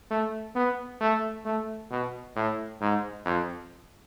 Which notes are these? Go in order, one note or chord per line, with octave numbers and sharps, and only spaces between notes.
A3
B3
A3
A3
B2
A2
G#2
F2